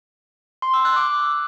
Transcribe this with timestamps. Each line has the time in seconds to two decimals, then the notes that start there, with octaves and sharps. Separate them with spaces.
0.62 C6
0.74 E6
0.85 F#6
0.96 D6